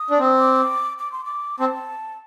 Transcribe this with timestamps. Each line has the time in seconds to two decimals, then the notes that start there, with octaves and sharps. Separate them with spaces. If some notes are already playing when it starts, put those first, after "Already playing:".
Already playing: D#6
0.10 D4
0.19 C4
0.39 D6
0.99 D6
1.12 C6
1.25 D6
1.59 C4 A5